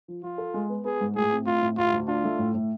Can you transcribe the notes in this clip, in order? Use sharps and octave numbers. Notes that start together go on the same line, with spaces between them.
F3
F3 F4
A4
G#3
B3
B3 G#4
G#2
A2 G#4
C4
A2 F4
A2
D2 F4
D2
D4 F4
A3
A2
A2